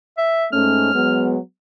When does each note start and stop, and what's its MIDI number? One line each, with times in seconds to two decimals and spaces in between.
0.18 0.46 76
0.53 0.91 44
0.53 0.91 57
0.53 0.91 61
0.53 1.28 89
0.94 1.37 54
0.94 1.37 56
0.94 1.37 59